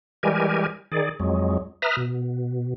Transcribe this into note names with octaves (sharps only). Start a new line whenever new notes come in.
E3 G3 G#3 G4 A#4 G#5
D#3 G#4 D5
F2 F#3 G#3
B4 E5 A#5 D#6 F6
B2